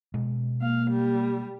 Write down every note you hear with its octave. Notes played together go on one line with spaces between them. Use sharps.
B2 G#3
A#3 F5
G3